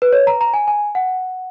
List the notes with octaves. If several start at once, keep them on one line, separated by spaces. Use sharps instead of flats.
B4
C#5
A#5
A#5
G#5
G#5
F#5